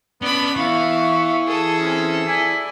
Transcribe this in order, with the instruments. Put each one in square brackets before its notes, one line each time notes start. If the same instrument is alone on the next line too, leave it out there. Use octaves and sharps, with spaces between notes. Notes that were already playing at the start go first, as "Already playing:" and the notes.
[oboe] B3 [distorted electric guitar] C#4 D4 [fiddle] D5 B5
[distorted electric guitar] E3 [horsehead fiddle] B3 E5 [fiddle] F5 [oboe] C#6
[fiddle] G#4 A4 [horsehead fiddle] A5
[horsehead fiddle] C4 C#4
[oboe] E4 [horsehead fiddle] D5 G#5